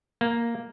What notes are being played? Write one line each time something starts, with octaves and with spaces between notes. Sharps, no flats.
A#3